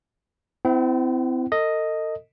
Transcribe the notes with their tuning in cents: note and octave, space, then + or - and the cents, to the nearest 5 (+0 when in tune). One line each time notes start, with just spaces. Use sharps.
C4 -30 E4 +0 F#5 +35
A4 +40 D#5 +0